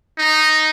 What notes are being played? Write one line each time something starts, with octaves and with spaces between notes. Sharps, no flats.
D#4